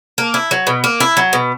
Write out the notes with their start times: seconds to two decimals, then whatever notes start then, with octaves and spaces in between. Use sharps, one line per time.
0.18 A#3
0.34 E4
0.51 F#3
0.67 B2
0.84 A#3
1.00 E4
1.17 F#3
1.33 B2